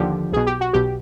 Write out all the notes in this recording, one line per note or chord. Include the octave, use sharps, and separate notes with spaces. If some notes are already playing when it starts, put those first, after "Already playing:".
Already playing: D#2 D3 F3 G4
B1 B2 G#4
G4
F#4
B1 B2 G4